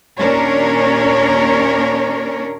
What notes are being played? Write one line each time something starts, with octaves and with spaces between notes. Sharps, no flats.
D#2 A#2 C#4 D4 A#4 C#5